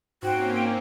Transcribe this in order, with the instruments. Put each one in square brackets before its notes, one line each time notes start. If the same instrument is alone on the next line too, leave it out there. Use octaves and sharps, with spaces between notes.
[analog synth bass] G#2 [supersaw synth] A#3 C4 C#4 [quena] F#4 [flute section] C5 G5